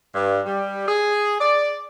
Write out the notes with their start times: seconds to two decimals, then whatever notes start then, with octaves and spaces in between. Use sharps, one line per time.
0.14 G2
0.45 G3
0.87 G#4
1.39 D5